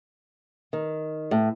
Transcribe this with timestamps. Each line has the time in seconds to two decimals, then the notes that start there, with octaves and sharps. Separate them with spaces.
0.73 D#3
1.31 A2